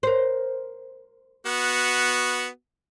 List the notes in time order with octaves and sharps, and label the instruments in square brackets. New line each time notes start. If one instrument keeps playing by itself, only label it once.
[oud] A#4 C5
[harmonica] B3 F#4